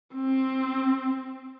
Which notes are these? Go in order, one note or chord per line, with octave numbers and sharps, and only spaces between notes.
C4